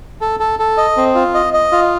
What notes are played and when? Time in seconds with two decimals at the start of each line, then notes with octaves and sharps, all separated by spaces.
0.21 A4
0.40 A4
0.59 A4
0.77 D#5
0.97 C4
1.15 F4
1.34 D#5
1.53 D#5
1.72 F4